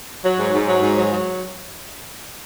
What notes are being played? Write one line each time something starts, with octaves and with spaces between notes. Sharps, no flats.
F#3
G#2
G#2
F#3
G#2
F#3
F#3